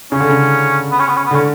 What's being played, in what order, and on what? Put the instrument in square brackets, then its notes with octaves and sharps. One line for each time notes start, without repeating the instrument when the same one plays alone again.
[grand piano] C#3 [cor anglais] C#4
[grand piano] D3
C#3
[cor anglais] B3
C#4
B3
C#4
B3
[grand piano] D3 [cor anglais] C#4